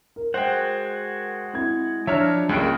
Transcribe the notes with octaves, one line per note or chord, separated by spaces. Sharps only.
A#4
G#3 F#4 C5 F#5 G5
C4 E4 G#6
F3 D4 C#5 E5 A#5 F6
C#2 C#3 G3 A#3 G#5 F#6 D7